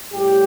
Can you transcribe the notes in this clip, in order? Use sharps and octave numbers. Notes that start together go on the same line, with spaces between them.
A2 G3 G4